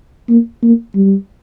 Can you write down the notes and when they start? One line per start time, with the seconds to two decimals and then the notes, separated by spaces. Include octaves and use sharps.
0.29 A#3
0.63 A#3
0.95 G3